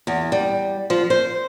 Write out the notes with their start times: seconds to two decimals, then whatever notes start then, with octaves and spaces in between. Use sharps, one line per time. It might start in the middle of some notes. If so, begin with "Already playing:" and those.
0.07 E2
0.32 G3
0.90 F3
1.10 C5